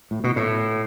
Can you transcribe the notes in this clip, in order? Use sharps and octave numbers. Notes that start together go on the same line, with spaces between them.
A2
B2
A2